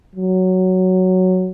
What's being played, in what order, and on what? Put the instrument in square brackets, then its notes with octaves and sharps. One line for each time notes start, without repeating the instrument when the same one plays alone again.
[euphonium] F#3